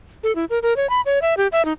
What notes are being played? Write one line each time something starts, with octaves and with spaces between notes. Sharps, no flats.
A4
E4
A#4
A#4
C#5
B5
C#5
E5
G4
E5
D#4